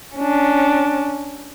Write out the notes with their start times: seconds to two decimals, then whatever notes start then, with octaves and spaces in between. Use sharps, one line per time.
0.16 C#4 D4